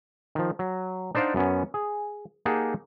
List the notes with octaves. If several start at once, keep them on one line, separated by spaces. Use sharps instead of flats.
D#3 F3
F#3
D4 D#4 C5 D5 F5 F#5
F#2 B3 C#4
G#4
A#3 D#4 G4 G#4 F#5 A5